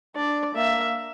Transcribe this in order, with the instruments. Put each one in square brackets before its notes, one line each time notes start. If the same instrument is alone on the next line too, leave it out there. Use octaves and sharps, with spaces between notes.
[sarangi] D4 [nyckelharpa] D5
[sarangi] A#3 [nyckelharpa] E5